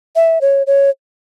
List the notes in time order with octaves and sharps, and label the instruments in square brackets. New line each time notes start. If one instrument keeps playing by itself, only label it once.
[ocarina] E5
C#5
C#5